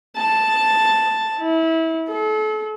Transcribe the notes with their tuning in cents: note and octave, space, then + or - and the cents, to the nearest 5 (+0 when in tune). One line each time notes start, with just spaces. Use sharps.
A5 +0
E4 -25
A4 -35